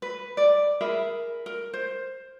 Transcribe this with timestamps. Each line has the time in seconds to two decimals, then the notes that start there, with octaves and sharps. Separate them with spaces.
0.02 B4
0.37 D5
0.81 G#4 A#4 E5 B5
1.46 A#4
1.73 C5